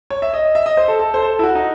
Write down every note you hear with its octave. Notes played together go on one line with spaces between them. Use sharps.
C#5
E5
D#5
E5
D#5
C5
A4
A4
C5
A4
E4
F#4
D#4